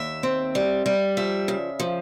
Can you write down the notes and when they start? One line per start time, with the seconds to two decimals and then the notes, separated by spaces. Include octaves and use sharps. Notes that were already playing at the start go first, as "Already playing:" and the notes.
Already playing: D#2 E5
0.23 C4
0.55 G3
0.86 G3
1.17 F3 E5
1.48 C#3
1.80 F3